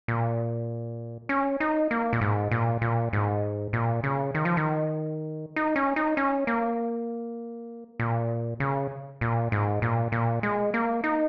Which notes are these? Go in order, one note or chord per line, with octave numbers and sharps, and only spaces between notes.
A#2
C#4
D#4
A#3
A#2
G#2
A#2
A#2
G#2
A#2
C#3
D#3
F3
D#3
D#4
C#4
D#4
C#4
A#3
A#2
C#3
A#2
G#2
A#2
A#2
G#3
A#3
D#4